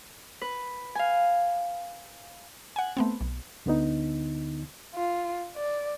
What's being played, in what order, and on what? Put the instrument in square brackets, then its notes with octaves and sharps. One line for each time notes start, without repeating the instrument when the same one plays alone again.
[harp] B4
F5 G#5
[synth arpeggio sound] F#5 G#5
A3 B3 C4
B1
[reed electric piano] D2 D3 B3 D#4
[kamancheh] F4
D5